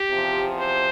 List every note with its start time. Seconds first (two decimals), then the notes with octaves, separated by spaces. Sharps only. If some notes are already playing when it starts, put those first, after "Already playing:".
Already playing: G4
0.09 E2 C3 F3
0.56 C5